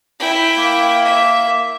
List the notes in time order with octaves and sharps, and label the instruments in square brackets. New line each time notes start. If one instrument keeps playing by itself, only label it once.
[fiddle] E4 G5
[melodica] A#3
[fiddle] E5